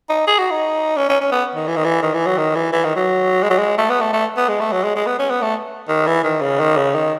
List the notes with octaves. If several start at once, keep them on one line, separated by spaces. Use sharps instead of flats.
D#4
G#4
F#4
D#4
C#4
C#4
C#4
B3
D#3
E3
D#3
E3
D#3
E3
F#3
D#3
E3
E3
D#3
F#3
G#3
F#3
G#3
A3
B3
A3
A3
B3
G#3
A3
F#3
G#3
G#3
B3
C#4
B3
A3
D#3
E3
D#3
C#3
D#3
C#3
D#3